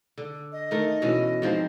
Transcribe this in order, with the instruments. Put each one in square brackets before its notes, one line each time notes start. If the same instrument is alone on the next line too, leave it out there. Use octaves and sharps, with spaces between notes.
[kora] D3
[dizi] D#5
[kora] D#3 A3 A#4
B2 E3 C#4
G#2 F3 C4